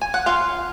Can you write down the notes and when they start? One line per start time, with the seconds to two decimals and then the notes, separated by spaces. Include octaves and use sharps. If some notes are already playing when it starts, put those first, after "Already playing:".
0.01 G#5
0.14 F#5
0.26 F4 F5